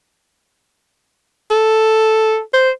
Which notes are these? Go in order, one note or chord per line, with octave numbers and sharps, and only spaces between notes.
A4
C5